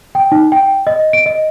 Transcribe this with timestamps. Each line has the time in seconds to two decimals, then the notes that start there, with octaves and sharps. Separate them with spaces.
0.15 G5
0.32 D#4
0.52 G5
0.87 D#5
1.13 D7
1.26 D#5